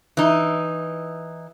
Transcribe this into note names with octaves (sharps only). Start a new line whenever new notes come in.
E3 D#4